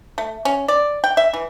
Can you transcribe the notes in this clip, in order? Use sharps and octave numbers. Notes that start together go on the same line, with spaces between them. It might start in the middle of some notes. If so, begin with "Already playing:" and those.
A3
C#4
D5
G5
E5
E3